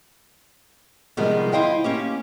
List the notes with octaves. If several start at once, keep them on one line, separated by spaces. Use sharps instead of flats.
C3 D#3 F3 G3 G#3 B3
E4 C5 D#5 F5 G5
A#3 C#4 G4